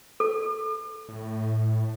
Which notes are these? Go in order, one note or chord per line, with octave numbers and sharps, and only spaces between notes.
A4
A2